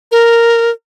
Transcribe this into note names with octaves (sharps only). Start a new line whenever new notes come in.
A#4